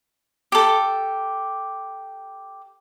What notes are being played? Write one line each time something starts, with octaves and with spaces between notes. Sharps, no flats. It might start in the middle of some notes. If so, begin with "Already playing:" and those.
G4 A4